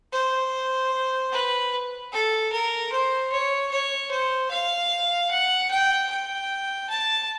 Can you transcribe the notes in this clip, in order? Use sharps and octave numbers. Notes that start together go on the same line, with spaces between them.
C5
B4
A4
A#4
C5
C#5
C#5
C5
F5
F#5
G5
G5
A5